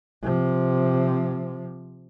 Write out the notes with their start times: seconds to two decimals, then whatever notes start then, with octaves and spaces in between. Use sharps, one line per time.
0.22 C3 F3